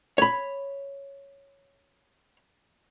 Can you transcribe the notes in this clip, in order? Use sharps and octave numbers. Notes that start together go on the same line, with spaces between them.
C#5 B5